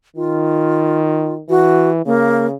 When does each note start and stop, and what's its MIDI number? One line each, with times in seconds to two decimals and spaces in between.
0.16 1.43 51
0.16 1.34 65
1.50 2.06 52
1.50 1.90 66
2.06 2.55 49
2.06 2.46 58